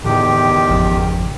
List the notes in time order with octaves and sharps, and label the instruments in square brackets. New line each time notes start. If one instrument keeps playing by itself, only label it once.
[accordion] E2 D#3 G4 [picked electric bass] A2 D3
[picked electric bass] G#1 F2 C#3